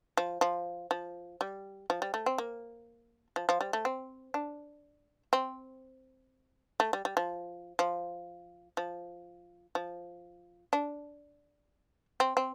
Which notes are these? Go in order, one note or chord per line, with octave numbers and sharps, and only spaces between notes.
F3
F3
F3
G3
F3
G3
A3
C4
A#3
F3
F3
G3
A3
C4
D4
C4
A3
G3
G3
F3
F3
F3
F3
D4
C4
C4